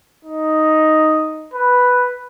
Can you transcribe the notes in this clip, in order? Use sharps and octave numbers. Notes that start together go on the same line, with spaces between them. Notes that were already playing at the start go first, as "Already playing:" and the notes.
D#4
B4